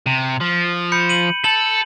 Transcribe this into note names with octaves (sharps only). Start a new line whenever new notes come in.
C3
F3
B5 G6 C#7
D#7 F#7
A4 F#7